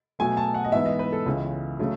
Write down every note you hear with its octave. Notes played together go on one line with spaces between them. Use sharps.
B2 F#3 A3 G#5
A5
F#5
D#5
G#2 E3 B3 E5
D#5
B4
A4
C#2 C#3 E3 G#3
C#3 F#3 A3